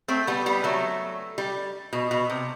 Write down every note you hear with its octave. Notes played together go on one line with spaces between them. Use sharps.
A3 C4
G3 B3
G3 B3
F#3 A3
G3
B2
B2
C3